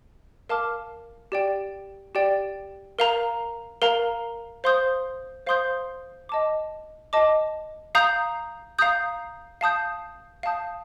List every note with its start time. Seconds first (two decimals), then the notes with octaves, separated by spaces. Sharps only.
0.49 A#4 F5 A5 D6 F6
1.32 G4 D5 G5
2.15 G4 D5 G5
2.99 A#4 F5 A#5
3.82 A#4 F5 A#5
4.64 C5 F5 C6 D#6 G6
5.47 C5 F5 C6 D#6 G6
6.29 D#5 A5 D6
7.13 D#5 A5 D6
7.95 F5 A#5 D#6 G6
8.79 F5 A#5 D#6 G6
9.61 F5 A5 D#6 G6
10.43 F5 A5 D#6 G6